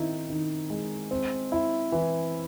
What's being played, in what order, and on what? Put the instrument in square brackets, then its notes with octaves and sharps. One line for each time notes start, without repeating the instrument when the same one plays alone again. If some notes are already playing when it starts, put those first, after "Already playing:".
Already playing: [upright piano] D#3 C4 [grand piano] D#4 E4
[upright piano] D#3
G#3
C4
E4
E3